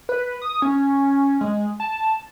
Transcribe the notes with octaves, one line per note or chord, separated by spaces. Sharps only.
B4
D#6
C#4
G#3
A5